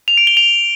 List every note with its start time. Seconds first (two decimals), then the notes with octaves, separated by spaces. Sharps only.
0.08 F7
0.17 D7
0.27 G7
0.37 F7